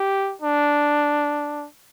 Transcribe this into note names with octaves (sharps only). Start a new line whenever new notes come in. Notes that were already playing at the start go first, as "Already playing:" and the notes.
Already playing: G4
D4